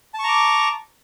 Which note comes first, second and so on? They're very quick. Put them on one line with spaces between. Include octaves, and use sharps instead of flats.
A5 C#6 A#5 D6